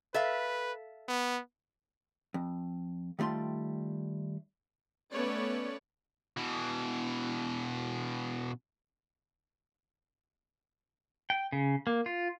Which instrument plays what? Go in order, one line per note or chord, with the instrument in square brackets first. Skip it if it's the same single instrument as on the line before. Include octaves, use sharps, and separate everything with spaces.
[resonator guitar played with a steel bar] A4 E5 F5 [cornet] B4
[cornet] B3
[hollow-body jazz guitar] F2
D#3 G3 A3 F4 C6
[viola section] A3 B3 C#4 B4 C#5 D5
[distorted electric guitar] B2 E3
[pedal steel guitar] G5
C#3
A#3
F4